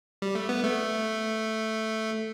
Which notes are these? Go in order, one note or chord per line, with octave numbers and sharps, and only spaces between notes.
G3
A3
B3
A3